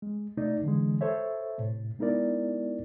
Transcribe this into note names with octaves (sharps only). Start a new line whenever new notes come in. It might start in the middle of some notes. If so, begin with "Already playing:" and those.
G#3
C3 A3 D#4 D5
D3 E3 G#3
A4 C5 C#5 E5
A2 C3
G#3 B3 D#4 E4 A#4 D5